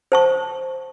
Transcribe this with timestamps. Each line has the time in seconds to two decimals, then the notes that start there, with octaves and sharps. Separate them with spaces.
0.12 C5 A5 C#6